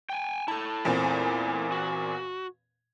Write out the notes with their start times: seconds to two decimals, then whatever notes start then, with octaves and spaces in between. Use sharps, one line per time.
0.09 G5 G#5
0.48 E4 A4 A5
0.85 E2 A#2 C4
1.72 F#4